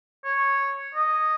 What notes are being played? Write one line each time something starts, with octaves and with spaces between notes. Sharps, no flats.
C#5
D#5